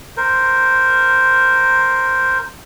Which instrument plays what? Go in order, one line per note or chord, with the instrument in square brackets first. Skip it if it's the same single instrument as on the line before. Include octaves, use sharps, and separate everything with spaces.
[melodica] A#4 C5